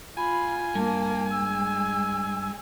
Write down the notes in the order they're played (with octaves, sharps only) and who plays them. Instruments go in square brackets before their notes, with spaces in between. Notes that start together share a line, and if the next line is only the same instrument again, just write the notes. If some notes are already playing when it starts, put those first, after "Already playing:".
[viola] F4 [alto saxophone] G#5 [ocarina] B5
[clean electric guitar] G2 [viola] A#3 A#4 [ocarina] A5
[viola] G#3 [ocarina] E6